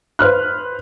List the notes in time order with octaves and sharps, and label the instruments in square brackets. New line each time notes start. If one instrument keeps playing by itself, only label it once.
[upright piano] B4 C5 F6 F#6